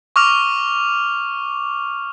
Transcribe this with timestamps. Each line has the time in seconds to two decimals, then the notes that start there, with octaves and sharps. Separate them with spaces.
0.16 C#6 D6 F6 F7